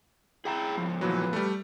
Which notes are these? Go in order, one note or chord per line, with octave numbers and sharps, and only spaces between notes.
E4 G#4 G5 A#5
G#2 F3
A#2 E3 F#3 B4
G3 A3